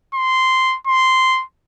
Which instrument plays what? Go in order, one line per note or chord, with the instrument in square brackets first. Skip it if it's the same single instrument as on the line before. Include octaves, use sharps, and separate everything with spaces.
[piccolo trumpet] C6
C6